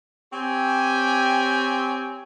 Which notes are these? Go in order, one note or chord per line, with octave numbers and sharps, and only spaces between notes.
C4 G4 C#5 G5 G#5